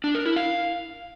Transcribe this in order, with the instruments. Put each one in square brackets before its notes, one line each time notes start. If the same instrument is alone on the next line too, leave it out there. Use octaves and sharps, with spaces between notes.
[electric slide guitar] D4
A#4
E4
F5